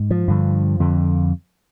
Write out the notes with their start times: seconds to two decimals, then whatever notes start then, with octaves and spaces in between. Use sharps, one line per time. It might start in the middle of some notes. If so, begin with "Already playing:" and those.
Already playing: G#2
0.11 F3
0.28 G2 D3
0.80 F2 D3